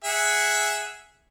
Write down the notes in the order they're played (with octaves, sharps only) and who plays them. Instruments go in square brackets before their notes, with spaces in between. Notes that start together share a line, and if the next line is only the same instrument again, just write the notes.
[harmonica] G#4 E5 F#5